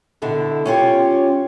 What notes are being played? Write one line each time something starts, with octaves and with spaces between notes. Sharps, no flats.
B2 D3 E4
C#4 F4 G4 C#5